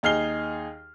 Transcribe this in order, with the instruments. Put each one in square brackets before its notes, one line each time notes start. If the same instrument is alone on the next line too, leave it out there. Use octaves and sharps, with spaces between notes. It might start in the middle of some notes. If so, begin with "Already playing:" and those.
[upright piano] D#2 D#4 G#4 F6 C7 G7